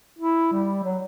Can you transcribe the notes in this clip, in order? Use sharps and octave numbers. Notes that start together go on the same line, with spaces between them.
E4
G3
F#3